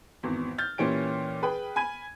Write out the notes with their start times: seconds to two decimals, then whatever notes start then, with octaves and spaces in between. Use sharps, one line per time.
0.23 G#1 E2
0.58 F6 G6 A6
0.78 A#2 E3 C#4 G4 D7
1.42 G#4 B4 G5
1.76 G#5 B5 G#6 D#7